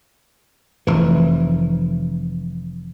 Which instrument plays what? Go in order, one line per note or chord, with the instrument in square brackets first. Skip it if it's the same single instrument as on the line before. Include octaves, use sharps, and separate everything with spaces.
[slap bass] F1 E3